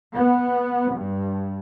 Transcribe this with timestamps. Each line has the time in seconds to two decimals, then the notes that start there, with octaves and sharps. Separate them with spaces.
0.15 B3
0.94 G2